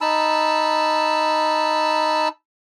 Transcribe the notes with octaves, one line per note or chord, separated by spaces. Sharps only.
D#4 A5 B5 E6